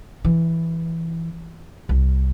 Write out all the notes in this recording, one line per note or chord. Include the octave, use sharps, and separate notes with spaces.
E3
C2